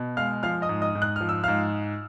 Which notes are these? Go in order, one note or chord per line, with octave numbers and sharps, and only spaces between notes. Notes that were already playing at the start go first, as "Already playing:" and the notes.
Already playing: B2
G#3 F5 F6
F3 F5 F6
D#5 D#6
G#2
D#5 D#6
G#2
F#6
F3 F6
E6
G#2 F5 F6